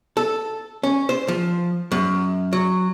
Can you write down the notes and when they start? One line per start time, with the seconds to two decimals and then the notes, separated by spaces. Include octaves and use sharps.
0.17 A4
0.83 C#4
1.09 C5
1.28 F3
1.92 F#2
2.53 F#3